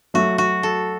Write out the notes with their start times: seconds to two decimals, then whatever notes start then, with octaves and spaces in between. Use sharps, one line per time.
0.14 F#3 A3 F#4
0.38 F#4
0.63 A4